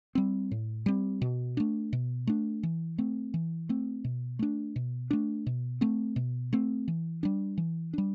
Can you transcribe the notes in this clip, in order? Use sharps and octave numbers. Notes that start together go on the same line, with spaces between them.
G3 C4
A2
G3 C4
B2
A3 D4
B2
A3 D4
E3
A3 C4
E3
A3 C4
B2
A3 D4
B2
A3 D4
B2
A3 C4
B2
A3 C4
E3
G3 D4
E3
G3 D4